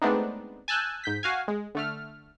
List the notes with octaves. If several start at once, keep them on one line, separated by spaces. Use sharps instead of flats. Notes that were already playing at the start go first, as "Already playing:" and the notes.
G#3 A3 B3 C4 D4 D#4
G#5 A5 E6 F#6 G6
G#2 G6 B6
F#4 F5 G#5
G#3
D3 A3 F6